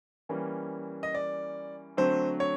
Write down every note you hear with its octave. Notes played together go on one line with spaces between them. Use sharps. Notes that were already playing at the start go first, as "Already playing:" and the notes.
E3 G3 A#3 C#4
D#5
D5
D3 F#3 A3 C4 C5
C#5